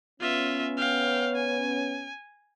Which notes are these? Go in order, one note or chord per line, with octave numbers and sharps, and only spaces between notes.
B3 C#4 F4 E5
F5 G5
G#5